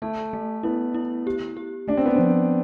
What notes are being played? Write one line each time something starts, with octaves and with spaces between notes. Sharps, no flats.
A3 A4
A3
B3 E4
E4
G4
G4
A3 D4
C4
B3
F3 C4